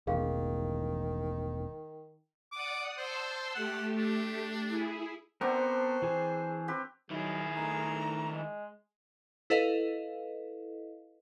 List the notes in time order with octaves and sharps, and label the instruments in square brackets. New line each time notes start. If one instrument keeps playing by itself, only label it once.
[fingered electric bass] E1 A1 [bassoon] D#3 [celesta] G#4 F5
[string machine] D5 F#5 D#6 [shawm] D6
[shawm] C5 [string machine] A5 C6 E6
[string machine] A3 G4 [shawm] F#5
[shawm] D4
[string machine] E4 G#4
[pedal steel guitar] B3 A#4 [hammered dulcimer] C4 D4 F#4 [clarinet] C5
[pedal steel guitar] E3 G#4
[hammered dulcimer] C4 G4 B4
[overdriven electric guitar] D#3 E4 [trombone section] F#3 D#4 [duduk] G#4
[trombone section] A3 D4 D#4 [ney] A#5
[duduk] G#3
[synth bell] E4 A4 B4 D#5 F5